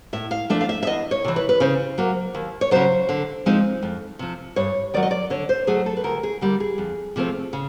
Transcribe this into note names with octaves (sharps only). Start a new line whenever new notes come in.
A2 E5
F5
F3 A3 D4 E5
F5
E5
E5
E2 D#5
C#5
C3 E3
B4
B4
C#3 C5
F#3 A#3
D#2
C#5
C#3 F#3 C5
D3
F3 G#3 C4 D#4
F2
C3 F3
G2 C#5
D#3 F#3 D5
D#5
D5
D3 C#5
C5
F#3 A3 G#4
A4
B4
D2 A#4
G#4
D3 G3 A#3
G#4
F2
C3 F3 A3 C4
C#3